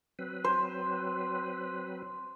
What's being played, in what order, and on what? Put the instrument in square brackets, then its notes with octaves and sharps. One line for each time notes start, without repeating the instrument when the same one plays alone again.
[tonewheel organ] F#3 C4 B4
[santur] C5